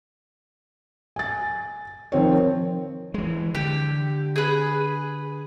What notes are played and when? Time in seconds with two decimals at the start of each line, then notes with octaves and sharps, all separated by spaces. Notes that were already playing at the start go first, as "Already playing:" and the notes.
1.16 G#5 A6
2.12 D#3 F3 C4 C#5
3.14 E3 G#3
3.55 D3 G4
4.36 G#4 B4